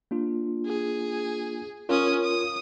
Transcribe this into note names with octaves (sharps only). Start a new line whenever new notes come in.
A#3 D4 F4
G#4
C#4 F4 A#4 C#5 D#6
D#6